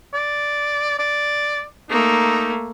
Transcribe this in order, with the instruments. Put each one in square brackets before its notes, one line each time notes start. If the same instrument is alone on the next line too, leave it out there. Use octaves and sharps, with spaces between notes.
[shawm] D5
D5
[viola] A3 A#3 [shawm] D#4